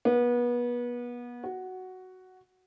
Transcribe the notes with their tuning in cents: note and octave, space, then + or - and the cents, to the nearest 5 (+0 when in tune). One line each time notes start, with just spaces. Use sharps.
B3 -30
F#4 +5